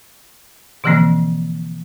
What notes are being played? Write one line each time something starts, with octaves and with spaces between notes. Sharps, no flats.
B2 D3 E3 F3 A#3 C4